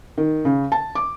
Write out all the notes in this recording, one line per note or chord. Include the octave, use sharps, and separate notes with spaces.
D#3
C#3
A5
D6